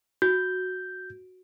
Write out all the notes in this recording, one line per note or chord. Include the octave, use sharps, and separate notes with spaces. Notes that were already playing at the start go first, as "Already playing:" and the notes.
F#4 G6